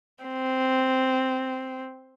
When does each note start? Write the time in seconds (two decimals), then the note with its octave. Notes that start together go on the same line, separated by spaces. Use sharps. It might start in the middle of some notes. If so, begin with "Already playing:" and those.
0.24 C4